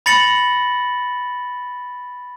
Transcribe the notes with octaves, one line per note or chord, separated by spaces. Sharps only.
B5 A6 A#6 C#7 F#7